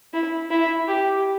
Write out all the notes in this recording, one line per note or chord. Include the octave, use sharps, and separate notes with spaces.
E4
E4
G4